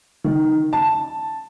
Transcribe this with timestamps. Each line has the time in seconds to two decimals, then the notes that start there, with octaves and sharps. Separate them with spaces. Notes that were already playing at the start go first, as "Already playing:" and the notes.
0.24 D#3
0.73 A5